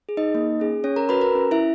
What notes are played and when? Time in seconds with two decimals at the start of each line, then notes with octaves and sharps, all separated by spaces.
0.09 G#4
0.17 D#4 D#5
0.35 A#3
0.60 C#4 G#4
0.84 C#4 C#5
0.96 A#4 A#5
1.09 F#4 B4 B5
1.21 A#4 A#5
1.35 C#4
1.51 E4 E5